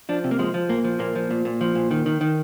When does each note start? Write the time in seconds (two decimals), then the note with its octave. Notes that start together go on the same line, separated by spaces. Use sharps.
0.09 F3 D4
0.24 C3
0.31 A#3
0.39 F3 G#3
0.54 F3
0.69 A#2 A#3
0.84 F3
0.99 A#2 A#3
1.16 F3
1.31 A#2
1.45 A#2
1.61 F3
1.75 A#2
1.91 D#3
2.06 D#3
2.21 D#3